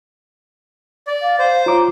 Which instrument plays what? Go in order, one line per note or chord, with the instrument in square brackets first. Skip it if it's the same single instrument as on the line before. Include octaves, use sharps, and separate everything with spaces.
[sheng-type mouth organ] D5
[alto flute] F5
[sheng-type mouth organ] C5 [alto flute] F5
[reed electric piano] F4 C#5 D6 [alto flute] A#5